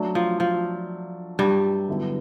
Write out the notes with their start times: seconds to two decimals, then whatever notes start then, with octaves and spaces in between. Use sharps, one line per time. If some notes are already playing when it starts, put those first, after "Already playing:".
Already playing: F#3 A3 D4
0.15 F3
0.40 F3
1.39 G2 G3
1.89 D3 F#3 B3 E4